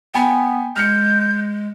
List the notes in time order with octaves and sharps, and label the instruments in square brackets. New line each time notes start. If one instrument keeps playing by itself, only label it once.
[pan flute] B3 [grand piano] G5 G#5 B5
[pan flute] G#3 [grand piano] F6 C#7 [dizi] G6